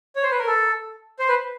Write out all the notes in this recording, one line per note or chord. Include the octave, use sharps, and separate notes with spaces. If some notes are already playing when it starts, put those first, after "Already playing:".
C#5
C5
B4
A#4
A4
C5
B4